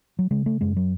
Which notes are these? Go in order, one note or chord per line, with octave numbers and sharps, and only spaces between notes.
F#3
C#3 G#3
A3
F#2 G#3
F#3